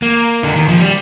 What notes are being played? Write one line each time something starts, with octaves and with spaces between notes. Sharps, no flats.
A#3
D3
D#3
F3
G3